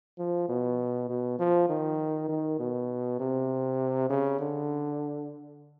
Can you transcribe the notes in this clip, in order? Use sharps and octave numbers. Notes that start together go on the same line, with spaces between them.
F3
B2
B2
F3
D#3
D#3
B2
C3
C#3
D3